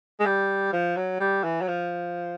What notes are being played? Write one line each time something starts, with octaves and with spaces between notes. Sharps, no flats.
G#3
G3
F3
F#3
G3
E3
F#3
F3